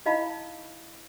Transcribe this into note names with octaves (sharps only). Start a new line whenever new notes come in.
D#4 E4 D#5 F5 A5 B5